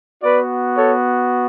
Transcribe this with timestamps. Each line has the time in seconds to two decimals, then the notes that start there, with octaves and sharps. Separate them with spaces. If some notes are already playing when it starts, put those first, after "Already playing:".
0.23 B3 F#4 B4 D5
0.76 A4 C#5